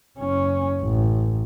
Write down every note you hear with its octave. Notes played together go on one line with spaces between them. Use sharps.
F#1 C#4
A1